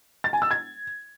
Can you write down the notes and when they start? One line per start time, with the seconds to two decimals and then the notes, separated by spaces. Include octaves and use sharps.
0.24 A6
0.33 G#5
0.42 E6
0.51 G#6